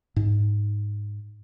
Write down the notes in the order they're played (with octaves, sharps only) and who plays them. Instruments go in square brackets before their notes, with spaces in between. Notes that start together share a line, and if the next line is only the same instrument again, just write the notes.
[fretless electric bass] G#2